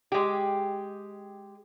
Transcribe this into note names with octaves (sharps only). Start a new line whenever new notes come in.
G#3 G4